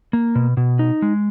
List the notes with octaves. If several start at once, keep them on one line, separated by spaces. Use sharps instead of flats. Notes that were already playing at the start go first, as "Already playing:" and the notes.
A#3
B2
B2
D#4
G#3